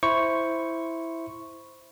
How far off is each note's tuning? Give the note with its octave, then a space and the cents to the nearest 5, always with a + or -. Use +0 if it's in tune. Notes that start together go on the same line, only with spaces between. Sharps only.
E4 +0 C5 +0 C#6 +0